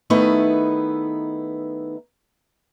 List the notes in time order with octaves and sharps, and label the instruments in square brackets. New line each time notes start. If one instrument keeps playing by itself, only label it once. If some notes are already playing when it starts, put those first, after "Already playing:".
[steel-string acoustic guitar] D#3 A3 B3 D#4 E4 B4